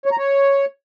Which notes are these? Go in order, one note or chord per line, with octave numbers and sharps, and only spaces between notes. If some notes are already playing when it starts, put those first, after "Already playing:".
C#5
A#5
C#5